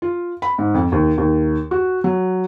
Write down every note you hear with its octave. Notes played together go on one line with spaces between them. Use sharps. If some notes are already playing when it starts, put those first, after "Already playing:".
F4
B5
G#2
F2
D#2
D#2
F#4
F#3